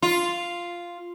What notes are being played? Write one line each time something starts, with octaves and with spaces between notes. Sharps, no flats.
F4